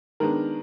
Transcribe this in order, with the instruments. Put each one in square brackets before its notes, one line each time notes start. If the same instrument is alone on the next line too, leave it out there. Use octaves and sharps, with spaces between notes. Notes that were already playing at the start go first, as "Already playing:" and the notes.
[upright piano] D#3 G#3 B3 D4 A#4